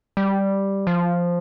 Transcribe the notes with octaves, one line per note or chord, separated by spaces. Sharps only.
G3
F3